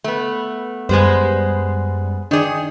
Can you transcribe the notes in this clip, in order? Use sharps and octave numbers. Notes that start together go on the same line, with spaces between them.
A3 B3
F#2 G3 G#3 B3 C5
D#3 D4 G#4 D5